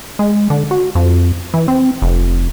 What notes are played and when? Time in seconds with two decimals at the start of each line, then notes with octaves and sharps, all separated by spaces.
0.19 G#3
0.50 D3
0.71 F#4
0.95 F2
1.54 E3
1.68 C4
2.02 F1